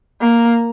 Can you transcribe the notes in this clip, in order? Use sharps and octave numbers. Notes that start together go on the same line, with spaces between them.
A#3